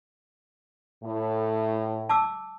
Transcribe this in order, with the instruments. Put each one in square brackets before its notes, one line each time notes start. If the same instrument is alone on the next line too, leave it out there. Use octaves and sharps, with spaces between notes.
[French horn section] A2
[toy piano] A5 D6 E6